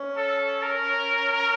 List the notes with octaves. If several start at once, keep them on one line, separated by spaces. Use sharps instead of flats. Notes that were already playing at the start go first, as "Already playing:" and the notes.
Already playing: C#4
A4
A#4